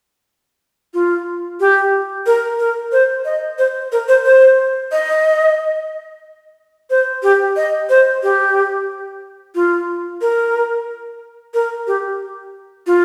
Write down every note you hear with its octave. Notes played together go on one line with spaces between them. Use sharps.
F4
G4
A#4
A#4
C5
D#5
C5
A#4
C5
C5
D#5
C5
G4
D#5
C5
G4
F4
A#4
A#4
G4
F4